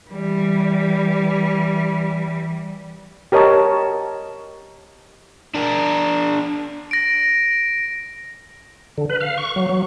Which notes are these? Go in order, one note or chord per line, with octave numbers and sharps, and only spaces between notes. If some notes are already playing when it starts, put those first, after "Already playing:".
E3 G3
G4 A#4 C#5 D#5 A5
D4 A#4
A#6 D7
D3
B4
F5
C#6
F#3
F#3